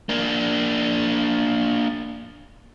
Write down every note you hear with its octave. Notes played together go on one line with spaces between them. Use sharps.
A#3 D4